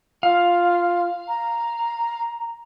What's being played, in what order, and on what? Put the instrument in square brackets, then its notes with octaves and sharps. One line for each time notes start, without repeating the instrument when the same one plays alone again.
[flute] F4 [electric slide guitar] F5
[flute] A#5